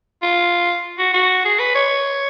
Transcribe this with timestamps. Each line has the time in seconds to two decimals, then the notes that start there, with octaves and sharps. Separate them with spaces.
0.23 F4
0.99 F#4
1.13 F#4
1.45 G#4
1.59 B4
1.75 C#5